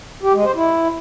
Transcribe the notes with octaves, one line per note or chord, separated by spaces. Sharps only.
G4
G#3
C5
E4